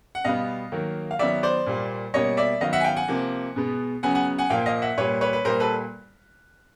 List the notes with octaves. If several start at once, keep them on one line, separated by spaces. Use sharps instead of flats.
F#5
B2 G3 B3 D#5 F5
D#3 F#3 A#3
F5
D#3 F#3 B3 D5 E5
C5 D5
A#2 G3 A#3
B2 G3 A#3 C#5 D#5
D5 E5
D#3 F#3 B3 D#5 F5
E5 F#5
G#5
F5 G5
F#5 G#5
C3 F3 A#3
B2 G#3 B3
C#3 F#3 B3 F#5 G#5
F#5 G#5
F#5 G#5
A#2 F3 A#3 F5 G5
D#5 F5
E5 F#5
A#2 G3 A#3 B4 C#5
B4 C#5
B4
A#2 G3 A#3 A#4 C5
A4 B4